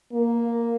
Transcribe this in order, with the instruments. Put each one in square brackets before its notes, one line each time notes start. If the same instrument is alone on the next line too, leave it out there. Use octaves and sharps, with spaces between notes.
[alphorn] A#3